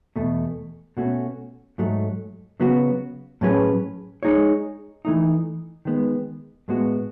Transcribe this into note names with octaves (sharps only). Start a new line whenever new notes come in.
E2 B2 A3
B2 A3 C#4 F#4
G#2 F#3 A3
C#3 F#3 B3 F#4
A2 F#3 C#4 G#4 B4
G#3 D#4 G#4 C#5
E3 A3 D#4
D#3 G#3 B3
A2 G#3 B3 F#4